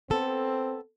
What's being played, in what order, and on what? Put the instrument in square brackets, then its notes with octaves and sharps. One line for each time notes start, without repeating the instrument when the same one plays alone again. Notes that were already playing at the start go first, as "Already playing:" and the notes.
[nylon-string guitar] B3 A4 [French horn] C4